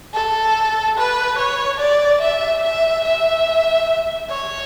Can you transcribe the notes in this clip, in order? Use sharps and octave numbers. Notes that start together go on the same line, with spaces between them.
A4
B4
C#5
D5
E5
E5
E5
C#5